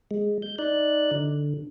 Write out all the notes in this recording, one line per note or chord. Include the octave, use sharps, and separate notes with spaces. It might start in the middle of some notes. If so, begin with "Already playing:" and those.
G#3
G6
D#4 D5 F#6
D3